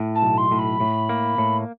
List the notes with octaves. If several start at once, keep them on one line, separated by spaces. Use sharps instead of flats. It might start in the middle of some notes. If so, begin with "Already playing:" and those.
Already playing: A2
A5
B1
C6
A2
B5
A2
A#3
A2